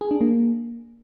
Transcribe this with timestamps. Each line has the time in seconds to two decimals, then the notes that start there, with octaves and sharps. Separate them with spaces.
0.01 G#4
0.11 D4
0.21 A#3